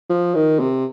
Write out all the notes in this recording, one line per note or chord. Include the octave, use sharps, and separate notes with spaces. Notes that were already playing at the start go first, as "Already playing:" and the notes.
F3
D#3
C3